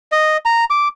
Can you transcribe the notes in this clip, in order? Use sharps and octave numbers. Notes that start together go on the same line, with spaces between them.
D#5
A#5
D6